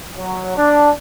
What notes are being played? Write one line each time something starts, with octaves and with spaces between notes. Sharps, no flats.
F#3
D4